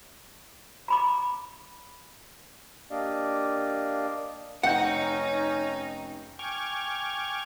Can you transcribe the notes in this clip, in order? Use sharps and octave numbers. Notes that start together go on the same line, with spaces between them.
A#5 B5 D6
A#3 D4 G4 D5 D#5 F5
F1 C#4 D#4 F#5 G5 G6
G5 G#5 C#6 D6 F6 G#6